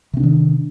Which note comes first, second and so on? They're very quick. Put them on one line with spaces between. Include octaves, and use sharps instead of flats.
C3 C4 D4 D#3